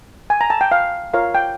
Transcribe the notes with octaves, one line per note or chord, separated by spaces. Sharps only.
G#5
A#5
A5
G5
F5
F4 A#4 C#5 F5
G5